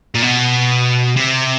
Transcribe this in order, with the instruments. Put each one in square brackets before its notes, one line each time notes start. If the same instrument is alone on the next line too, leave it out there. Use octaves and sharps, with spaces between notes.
[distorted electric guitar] A#2
B2
C3